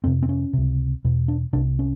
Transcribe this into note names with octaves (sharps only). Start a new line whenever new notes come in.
F2 C3 C4
C4
C#4
C#2 C3
E2 B2
D4
C2 C3 D4
C#4